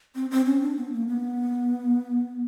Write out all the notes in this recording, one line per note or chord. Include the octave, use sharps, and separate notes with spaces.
C4
C4
C#4
D4
B3
A#3
B3